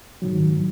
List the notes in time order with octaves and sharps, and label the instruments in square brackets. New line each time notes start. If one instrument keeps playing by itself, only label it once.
[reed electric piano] G#2 D#3 F#3